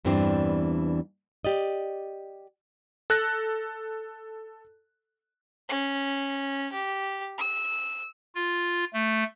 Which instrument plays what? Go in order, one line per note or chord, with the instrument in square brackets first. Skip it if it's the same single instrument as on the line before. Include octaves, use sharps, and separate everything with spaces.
[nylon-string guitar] E2 G2 E3 G3 C4 D4
G4 D5 D#5
[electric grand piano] A4 F#6 A#6
[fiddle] C#4
G4
E6
[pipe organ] F4
A3